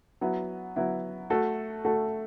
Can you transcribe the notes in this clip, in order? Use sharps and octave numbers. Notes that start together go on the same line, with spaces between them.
F#3 B3 E4
F#3 B3 E4
A3 F#4 A4
A3 F#4 A4